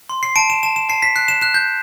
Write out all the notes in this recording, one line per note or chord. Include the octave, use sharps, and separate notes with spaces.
C6
C7
A5 D7
E7
A5 E7
E7
A5 C7
B6
F#6 C7
E7
F#6 E7
G6